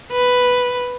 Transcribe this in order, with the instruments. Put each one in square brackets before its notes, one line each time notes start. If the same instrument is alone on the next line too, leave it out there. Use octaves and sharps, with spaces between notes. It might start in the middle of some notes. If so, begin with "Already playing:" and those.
[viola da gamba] B4